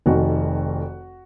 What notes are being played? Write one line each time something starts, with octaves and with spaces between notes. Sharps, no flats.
F1 F2 D#3 F#4